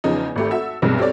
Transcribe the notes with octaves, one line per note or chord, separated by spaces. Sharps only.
E2 C#3 F3 D#4
G#1 A3 G4
F#4 A4 E5 E6
B1 G2 C3 G#3
C4 G4 A4 C#5 D5